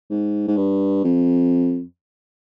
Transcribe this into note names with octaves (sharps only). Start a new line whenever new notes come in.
G#2
G#2
G2
F2